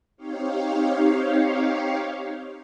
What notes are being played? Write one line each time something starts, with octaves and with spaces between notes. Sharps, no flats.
C4 D#4 G4 C#5 F5